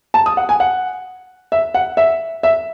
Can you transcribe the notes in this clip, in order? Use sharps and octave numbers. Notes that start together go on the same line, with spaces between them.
A5
D#6
F#5
G#5
F#5
E5
F#5
E5
E5